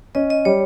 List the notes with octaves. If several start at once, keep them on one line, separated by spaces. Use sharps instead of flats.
C#4 D#5
D#5
G3 C#5